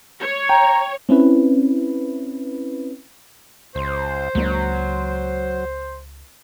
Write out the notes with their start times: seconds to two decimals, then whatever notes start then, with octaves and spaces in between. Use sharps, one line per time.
0.21 C#5
0.49 G5 A#5
1.09 C4 C#4 E4 B4
3.75 C#2 C5
4.35 C#2 F#3 A#3 D4